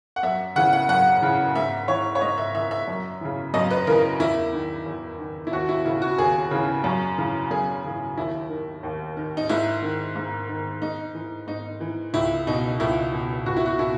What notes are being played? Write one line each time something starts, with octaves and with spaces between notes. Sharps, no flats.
F#5
F#2 E5
C#3 E3 F#5
F#5
F#2 F#5
C#3 E3
G#2 E5
E3 C#5
C#5
G#2 D#5
E5
E3 E5
E5
F#2
C#3 E3
F#2 D#5
B4
C#3 E3 A#4
E2 E4
D#3
E2
D#3
E4
D#2 F#4
E4
C#3 E3 E4
F#4
D#2 G#4
C#3 E3
F#2
C#3 E3
F#2 G#4
C#3 E3
D#2 E4
D#3
D#2
D#3
D#4
G#2 E4
D#3
G#2
D#3
G#2 D#4
E3
G#2 D#4
E3
C#2 E4
B2 D#4
C#2 E4
B2
C#2 F#4
E4
F#4
B2 E4